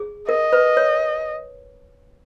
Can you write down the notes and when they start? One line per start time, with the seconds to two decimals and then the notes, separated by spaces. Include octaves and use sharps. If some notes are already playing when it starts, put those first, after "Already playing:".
Already playing: G#4
0.28 A#4 D#5
0.53 B4
0.77 C#5